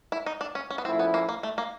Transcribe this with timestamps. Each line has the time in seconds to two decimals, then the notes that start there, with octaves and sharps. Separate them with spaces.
0.12 E4
0.26 D#4
0.41 D4
0.55 C#4
0.70 C#4
0.78 B3
0.85 A#2 F3 A3 C4 C#4 E4
0.99 B3
1.14 A#3
1.29 A#3
1.43 A3
1.58 A#3